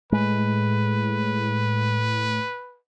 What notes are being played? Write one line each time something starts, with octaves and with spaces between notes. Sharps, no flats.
A2 G#3 B4